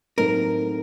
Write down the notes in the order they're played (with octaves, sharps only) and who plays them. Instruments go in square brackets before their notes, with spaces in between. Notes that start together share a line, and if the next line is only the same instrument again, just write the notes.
[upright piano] A2 F#3 A3 C4 D#4 [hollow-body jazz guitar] A#4